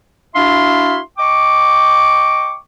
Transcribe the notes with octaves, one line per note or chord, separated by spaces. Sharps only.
D4 E4 F#4 E5 F5 C6
D#5 G5 C#6 D6